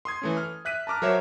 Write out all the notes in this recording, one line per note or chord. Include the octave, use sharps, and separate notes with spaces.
C6 D#6 G#6
E3 A3 C#4
F6
E5 F#6 B6 D#7
A5 A#5 D6 F6
F#3 A#4 C5 C#5 E5